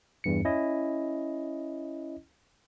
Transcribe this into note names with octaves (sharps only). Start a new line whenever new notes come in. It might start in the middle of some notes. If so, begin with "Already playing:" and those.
E2 G2 C#7
C#4 E4 D#5